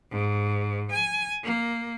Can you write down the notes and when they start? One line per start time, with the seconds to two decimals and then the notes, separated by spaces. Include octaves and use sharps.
0.11 G#2
0.92 G#5
1.43 A#3